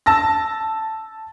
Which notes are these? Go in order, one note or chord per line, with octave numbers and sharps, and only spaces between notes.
A5 E6 A#6